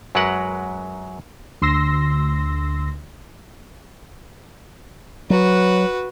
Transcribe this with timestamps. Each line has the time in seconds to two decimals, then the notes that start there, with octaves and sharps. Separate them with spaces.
0.15 F#2 F#3 G#3 A#4 B4 F#5
1.62 D2 C6 E6 A#6
5.30 F#3 F#4 B4